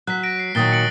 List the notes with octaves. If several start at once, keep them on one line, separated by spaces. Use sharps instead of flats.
F#3 F#6 B6
F#6 A#6 D7
C7
A#2 D#3 F#3 D#6 A6 G7
C#7 D7 F#7